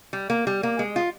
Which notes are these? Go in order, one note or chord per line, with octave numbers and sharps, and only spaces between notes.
G3
A#3
G3
A#3
G#3
F4